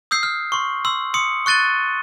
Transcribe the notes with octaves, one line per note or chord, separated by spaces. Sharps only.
D#6 E6 G6 C7
F6
C6 C#6
C6 E6
C6 D#6 C#7
C#6 F#6 A6 D#7 G7